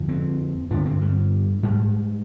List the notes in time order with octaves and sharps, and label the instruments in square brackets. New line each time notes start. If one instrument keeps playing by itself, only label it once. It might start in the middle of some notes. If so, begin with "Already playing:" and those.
Already playing: [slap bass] F2 D3
C4
G2 D3 D4
C4
G3
G#2 G3